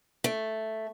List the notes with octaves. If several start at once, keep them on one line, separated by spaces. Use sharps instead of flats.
A3